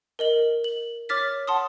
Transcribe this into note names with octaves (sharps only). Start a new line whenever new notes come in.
A#4 D#5 F#7
F#7
C#5 D6 F6 A6 B6
F#5 A5 C6 D#6